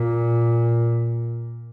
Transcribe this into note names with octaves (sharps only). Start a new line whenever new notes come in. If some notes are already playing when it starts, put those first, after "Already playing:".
Already playing: A#2